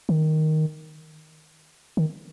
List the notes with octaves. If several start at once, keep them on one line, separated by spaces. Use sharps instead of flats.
D#3
D#3